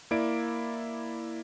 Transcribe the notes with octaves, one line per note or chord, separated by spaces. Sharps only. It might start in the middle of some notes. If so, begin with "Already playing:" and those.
A#3 E4 D5 D7